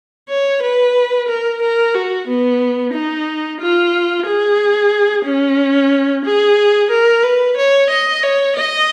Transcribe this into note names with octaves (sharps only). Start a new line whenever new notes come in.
C#5
B4
A#4
A#4
F#4
B3
D#4
F4
G#4
C#4
G#4
A#4
B4
C#5
D#5
C#5
D#5